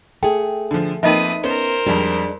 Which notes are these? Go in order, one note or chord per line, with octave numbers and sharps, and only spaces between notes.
A3 G#4 G5
D3 F3
F3 A#3 C4 D#4 B4 D#5 E5 D#6
B3 C#4 A#4 C5
F2 G3 G#3 D4